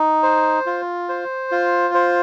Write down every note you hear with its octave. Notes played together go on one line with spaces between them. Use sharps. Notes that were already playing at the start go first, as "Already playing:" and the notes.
Already playing: D#4
C5
F4
C5
F4
C5